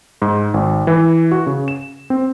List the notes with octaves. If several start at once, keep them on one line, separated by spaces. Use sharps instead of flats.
G#2
G#1
E3
F#4
C#3
E7
C4